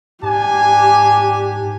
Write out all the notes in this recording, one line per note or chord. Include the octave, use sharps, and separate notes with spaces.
G#2 D4 G4 G#5